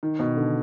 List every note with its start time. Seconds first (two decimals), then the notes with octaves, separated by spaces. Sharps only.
0.03 D#3
0.19 B2
0.37 D3